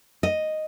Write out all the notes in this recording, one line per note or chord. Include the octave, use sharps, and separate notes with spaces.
D#5